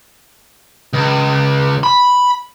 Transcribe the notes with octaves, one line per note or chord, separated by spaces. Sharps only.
C#2
B5